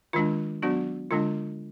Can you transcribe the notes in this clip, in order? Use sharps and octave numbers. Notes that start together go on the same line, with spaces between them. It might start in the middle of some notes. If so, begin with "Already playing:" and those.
D#3 G#3 D4 F4
F#3 B3 D4 F#4
D3 G#3 D4 F4